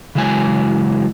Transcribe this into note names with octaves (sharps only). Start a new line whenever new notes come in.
C#3 E3 F#3 G#3 G#5